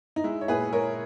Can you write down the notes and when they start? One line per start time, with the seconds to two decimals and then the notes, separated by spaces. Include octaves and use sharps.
0.16 D#4
0.24 G#3 E4
0.41 C#5
0.48 A#2 G#4 B4
0.73 G#3 A#4 C#5